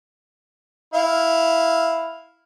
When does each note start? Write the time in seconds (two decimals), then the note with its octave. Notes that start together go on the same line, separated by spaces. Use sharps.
0.94 E4 F5